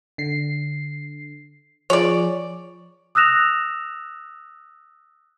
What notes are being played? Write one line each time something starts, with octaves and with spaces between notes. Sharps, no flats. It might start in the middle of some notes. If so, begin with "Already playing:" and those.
D3 C7
F3 G#4 C#5 D5
D#6 E6 F#6 A#6 E7 F7